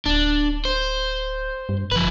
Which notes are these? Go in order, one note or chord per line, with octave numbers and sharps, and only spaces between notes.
D1 D4
C5
G2
F#1 F3 B4